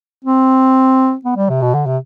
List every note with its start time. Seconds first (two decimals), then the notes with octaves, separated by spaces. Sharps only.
0.25 C4
1.25 B3
1.37 G3
1.49 C3
1.62 B2
1.74 D3
1.86 C3